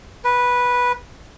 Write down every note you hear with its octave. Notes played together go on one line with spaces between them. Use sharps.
B4